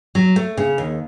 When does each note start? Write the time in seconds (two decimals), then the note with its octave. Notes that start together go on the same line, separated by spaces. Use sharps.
0.15 F#3
0.36 A3
0.57 C#3
0.78 D#2